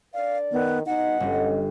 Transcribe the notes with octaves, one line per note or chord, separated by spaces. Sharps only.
D4 A#4 D5 F5
D#3 B3
G2 B2 D#4 D#5 F#5
G1 D3 C#4